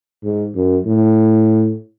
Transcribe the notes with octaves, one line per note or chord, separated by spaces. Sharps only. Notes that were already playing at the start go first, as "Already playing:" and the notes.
G#2
F#2
A2